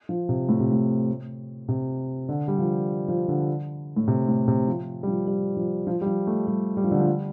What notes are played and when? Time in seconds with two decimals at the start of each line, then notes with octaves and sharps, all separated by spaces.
0.09 F3
0.29 C3
0.49 A2
0.60 C3
0.72 A2
1.68 C3
2.29 D3
2.48 G3
2.58 F3
3.08 F3
3.28 D3
3.96 A2
4.08 C3
4.28 A2
4.48 C3
4.68 F3
5.03 G3
5.08 F3
5.27 G3
5.57 F3
5.87 F3
6.01 G3
6.06 F3
6.27 A3
6.47 G3
6.77 G3
6.84 F3
6.91 D3
6.99 F3
7.06 G3